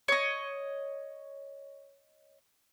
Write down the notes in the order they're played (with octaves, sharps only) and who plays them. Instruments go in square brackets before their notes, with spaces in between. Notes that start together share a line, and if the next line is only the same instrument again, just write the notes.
[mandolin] C#5 D#5